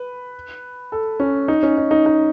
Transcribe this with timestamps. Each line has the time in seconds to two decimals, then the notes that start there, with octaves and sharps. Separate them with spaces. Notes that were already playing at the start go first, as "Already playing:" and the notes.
Already playing: B4
0.92 A4
1.20 C#4
1.48 D#4
1.63 C#4
1.77 D#4
1.91 D#4
2.06 D#4